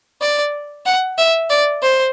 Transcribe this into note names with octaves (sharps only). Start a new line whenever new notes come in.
D5
F#5
E5
D5
C5